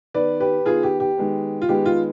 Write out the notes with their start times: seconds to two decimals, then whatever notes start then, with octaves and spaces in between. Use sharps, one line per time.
0.14 D#3 B3 B4 D5
0.40 G4 B4
0.66 D#3 B3 F4 G#4
0.83 G4
1.00 G4
1.17 D#3 G#3 B3
1.62 F4
1.69 D#3 G#3 B3 G4
1.86 F4